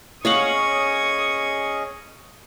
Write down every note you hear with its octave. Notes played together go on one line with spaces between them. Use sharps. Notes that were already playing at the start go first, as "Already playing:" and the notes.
C#4 G#4 C#5 D#5 F5 F#5 C#6 D#6